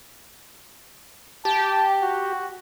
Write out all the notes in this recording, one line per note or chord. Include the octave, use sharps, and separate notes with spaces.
G4 A5
F#4